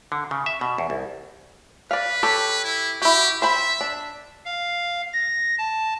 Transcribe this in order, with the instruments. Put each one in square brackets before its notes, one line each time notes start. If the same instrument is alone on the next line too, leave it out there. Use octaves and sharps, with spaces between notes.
[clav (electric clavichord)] D3
C#3
E5
B2
E2
C2
[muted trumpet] B4 [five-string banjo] D5 F5
[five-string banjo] G4 A4 C#5
[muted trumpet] E4
[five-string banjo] E4 F#4 [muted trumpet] G4
[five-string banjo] C5 G5 B5 [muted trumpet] E5
[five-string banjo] D4
[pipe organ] F5
A#6
A5